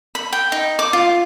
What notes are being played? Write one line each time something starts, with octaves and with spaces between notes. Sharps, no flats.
B5
G5
D#4
D6
F4